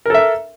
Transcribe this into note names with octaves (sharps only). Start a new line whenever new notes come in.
A4 A#4 E5